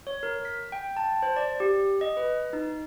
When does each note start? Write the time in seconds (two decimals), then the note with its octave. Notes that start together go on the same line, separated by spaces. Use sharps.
0.07 C#5
0.23 A#4
0.45 B6
0.72 G5
0.97 A5
1.23 C5
1.36 D5
1.60 G4
2.01 D#5
2.17 B4
2.53 D#4